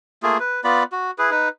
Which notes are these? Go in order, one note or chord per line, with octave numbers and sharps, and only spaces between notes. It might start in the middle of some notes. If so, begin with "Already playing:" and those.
A3 A#3 F4 G#4
B4
B3 F4 D5 B5
F#4
E4 G#4 B4
D#4 B4